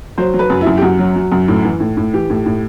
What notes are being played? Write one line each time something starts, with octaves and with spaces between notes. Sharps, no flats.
F#3 C5
F#3
B4
F#2
E4
F#2
G4
F#2 F#4
F#3
F#3
F#2
A2
E3
A2
A2
E3 G4
A2
A2